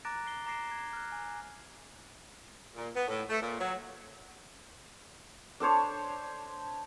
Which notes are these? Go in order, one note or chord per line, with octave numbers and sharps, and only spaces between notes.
A#5 D6 F#6 A6 A#6 D7
C7 G7
A#5 D6 A#6 C7 D7 E7
G#6
F6 F#6
G#5
A#2
B3
A2
A3
A#2
F#3
D4 A4 C5 C#5